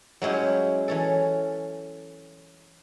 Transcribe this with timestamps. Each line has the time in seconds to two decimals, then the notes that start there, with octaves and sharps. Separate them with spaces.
0.22 F#3 G#3 C#4 E4 G4
0.88 E3 C#4 A4